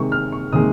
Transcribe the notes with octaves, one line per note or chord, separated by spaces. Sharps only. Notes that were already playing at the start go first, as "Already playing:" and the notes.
Already playing: C3 D#3 G#3 C#6
F6
C#6
C3 D#3 G#3 D#6